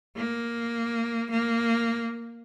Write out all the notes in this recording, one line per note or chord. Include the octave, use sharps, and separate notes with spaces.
A#3
A#3